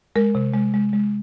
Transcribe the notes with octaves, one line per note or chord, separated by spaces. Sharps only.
G#3 A#4
C3
G#3
G#3
G#3